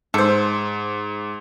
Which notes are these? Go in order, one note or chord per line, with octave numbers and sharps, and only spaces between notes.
G#2 A4 C5